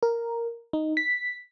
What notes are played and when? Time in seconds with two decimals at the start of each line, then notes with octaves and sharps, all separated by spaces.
0.03 A#4
0.73 D#4
0.97 B6